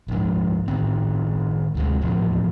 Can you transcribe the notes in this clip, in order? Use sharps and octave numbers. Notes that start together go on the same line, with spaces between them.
A#1 G#2
A2 D#3 C4
D2 C3 G#3
D#1 E2 A2 F3